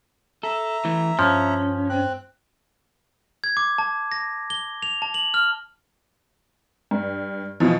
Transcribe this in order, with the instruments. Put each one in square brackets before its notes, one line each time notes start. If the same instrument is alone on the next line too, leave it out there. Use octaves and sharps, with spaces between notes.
[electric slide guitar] A4 [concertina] E5 A#5
[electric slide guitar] E3 A3
[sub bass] G2 [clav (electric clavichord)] F3 [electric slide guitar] C#4
[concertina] C4 F#6
[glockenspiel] G#6
D6
A5
A#6
G7
F7
A5
F#7
F6
[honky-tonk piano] G2
B2 E3 F3